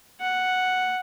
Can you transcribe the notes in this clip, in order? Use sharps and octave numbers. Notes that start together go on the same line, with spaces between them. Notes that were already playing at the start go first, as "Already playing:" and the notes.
F#5